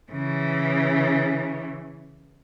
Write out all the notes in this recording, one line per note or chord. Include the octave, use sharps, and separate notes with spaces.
C#3 E3